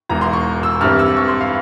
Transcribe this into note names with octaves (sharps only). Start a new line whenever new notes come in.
E1 E2 E3 A#5
C6
C#6
E6
G2 E3 G3 C4 F6
E6
C#6
C6
F5